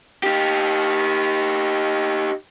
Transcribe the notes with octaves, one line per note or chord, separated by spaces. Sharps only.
D#4 G4